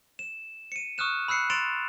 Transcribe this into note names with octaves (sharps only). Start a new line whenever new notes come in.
E7
C#7 D#7
C#6 D#6 F6 F#6 E7
B5 E6 F#6 C7 C#7
C6 A6 D7 E7 F7